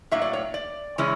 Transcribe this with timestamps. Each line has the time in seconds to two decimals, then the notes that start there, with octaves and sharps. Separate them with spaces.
0.11 A2 F#3 A#3 D4 E5
0.22 D5
0.33 C#5
0.54 D5
0.98 C#3 E3 G#3 C#4 E4